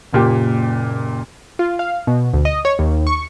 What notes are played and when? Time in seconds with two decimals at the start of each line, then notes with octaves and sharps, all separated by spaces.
0.13 F#1 A#2 G4
1.59 F4
1.79 F5
2.07 B2
2.33 D2
2.45 D#5
2.65 C#5
2.79 D#2
3.07 C#6